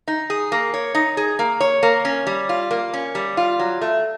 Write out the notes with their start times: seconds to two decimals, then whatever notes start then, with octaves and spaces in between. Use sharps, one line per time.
0.08 D#4
0.30 G#4
0.52 A#3
0.74 C#5
0.95 D#4
1.17 G#4
1.39 A#3
1.60 C#5
1.83 A#3
2.05 C#4
2.27 G3
2.49 F4
2.71 A#3
2.94 C#4
3.15 G3
3.37 F4
3.59 F#3
3.81 A3